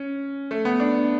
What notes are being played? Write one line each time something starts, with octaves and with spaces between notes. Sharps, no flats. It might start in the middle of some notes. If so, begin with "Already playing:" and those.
Already playing: C#4
A3
B3
D4